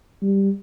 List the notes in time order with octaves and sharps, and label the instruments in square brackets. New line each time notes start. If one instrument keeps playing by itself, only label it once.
[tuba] G3